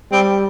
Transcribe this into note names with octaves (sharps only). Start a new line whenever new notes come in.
G3 C4